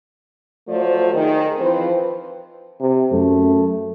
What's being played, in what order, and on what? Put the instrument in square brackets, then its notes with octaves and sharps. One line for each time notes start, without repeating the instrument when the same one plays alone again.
[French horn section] F3 F#3 A3 F4 C5 D5
D#3 G#4
E3 F3 C4 B4 C5
[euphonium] C3
[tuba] F#2 [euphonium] A3